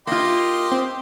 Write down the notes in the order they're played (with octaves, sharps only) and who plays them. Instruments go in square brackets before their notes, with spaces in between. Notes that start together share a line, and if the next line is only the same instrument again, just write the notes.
[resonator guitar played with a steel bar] A#3 F4 [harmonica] G4 D#5 C6
[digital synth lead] C4